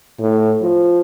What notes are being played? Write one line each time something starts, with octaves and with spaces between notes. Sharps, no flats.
A2
F3